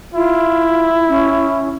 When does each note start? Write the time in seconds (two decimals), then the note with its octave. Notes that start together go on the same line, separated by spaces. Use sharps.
0.14 E4 F4
1.09 C#4